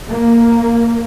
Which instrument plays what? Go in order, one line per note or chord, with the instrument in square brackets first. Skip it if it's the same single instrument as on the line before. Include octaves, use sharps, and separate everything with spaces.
[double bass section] A#3